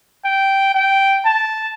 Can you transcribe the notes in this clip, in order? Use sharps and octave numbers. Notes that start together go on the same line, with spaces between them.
G5
G5
A5